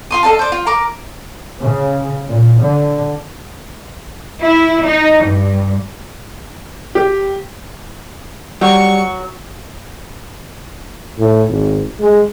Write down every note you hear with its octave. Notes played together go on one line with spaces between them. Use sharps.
F4 C6 D#6
A4 D#5 F5 A5
C5 D5
F4
A#4 D6
C#3
A#2
D3
E4
D#4
G2
G4
F#3 G3 C#6
A2
G#1
G#3